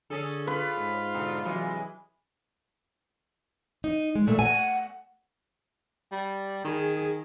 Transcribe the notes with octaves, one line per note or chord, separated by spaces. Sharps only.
D3 C#4 G#4 A4
F4 B4
G#2
B2 D3
C3 E3 F#3 G#3
D#4
G#3
A#2 A3
F#5 G#5
G3
D#3 G#4